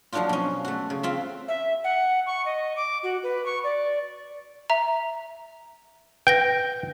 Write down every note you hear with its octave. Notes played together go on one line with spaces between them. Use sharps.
F3 F#3 A#3 D4 D#4 F4
B2 C#4
A3 F#4
C#3
C4 F4 E5
E5
F#5
C#6
D#5
D6
F#4
B4
C#6
D5
E5 A#5
B4 G5 G6 A#6